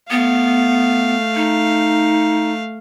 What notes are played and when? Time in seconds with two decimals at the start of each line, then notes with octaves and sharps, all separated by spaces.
0.10 A3 B3 F5
1.35 D#4